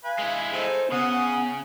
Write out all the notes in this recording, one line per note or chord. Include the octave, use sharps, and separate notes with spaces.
B4 F5 G#5
G#3 E4
D#4 G#4 A4 C5
C#3 B3 F#5 D#6